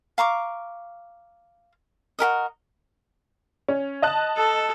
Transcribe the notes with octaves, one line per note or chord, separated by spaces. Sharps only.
F5 A#5 C#6 D6
F#4 G4 A#4 D#5
C#4
D#5 A5 F#6
A4